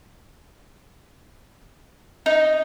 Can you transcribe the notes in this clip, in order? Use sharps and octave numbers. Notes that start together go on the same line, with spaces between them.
D#4